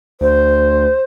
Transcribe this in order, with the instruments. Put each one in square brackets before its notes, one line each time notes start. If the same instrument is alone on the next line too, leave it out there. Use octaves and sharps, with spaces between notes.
[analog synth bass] D2 [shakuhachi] C5